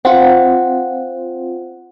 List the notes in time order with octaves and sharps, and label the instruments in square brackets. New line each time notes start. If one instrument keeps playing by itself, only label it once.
[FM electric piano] C4 F4 [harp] F#5